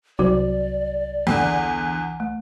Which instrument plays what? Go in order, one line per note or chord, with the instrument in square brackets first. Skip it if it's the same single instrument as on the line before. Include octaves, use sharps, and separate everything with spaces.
[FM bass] C2 [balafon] F#3 F#4 C5 [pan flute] D5
[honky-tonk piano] E2 D3
[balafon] A3